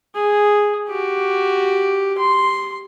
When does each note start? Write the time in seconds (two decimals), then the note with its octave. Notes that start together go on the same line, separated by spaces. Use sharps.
0.15 G#4
0.89 F#4 G4
2.18 C6